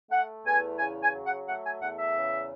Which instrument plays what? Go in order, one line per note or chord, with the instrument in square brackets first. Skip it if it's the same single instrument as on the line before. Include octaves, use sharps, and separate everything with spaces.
[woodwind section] A3 F#5
E2 G#5
C#3 G#5
G#5
F#3
F#5
A3 F#5
G#5
E2 F#5
E5
C#3